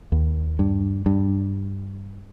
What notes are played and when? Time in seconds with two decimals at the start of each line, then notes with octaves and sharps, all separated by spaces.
0.12 D#2
0.59 G2
1.06 G2